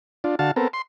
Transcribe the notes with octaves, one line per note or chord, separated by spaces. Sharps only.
D4 F4
D3 F#4 F5 A5
B3 C4 A4 A#4
C6